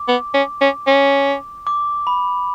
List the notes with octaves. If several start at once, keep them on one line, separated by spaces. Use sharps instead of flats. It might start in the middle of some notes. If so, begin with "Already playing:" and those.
Already playing: D6
B3
C#4
C#4
C#4
D6
B5